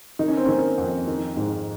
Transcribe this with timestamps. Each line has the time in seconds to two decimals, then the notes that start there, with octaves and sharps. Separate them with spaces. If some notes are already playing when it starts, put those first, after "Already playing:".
0.19 D#3 D#4
0.28 C#4
0.37 C4
0.45 D#3 A#3 C#4
0.78 F2
1.08 D#3
1.37 G#2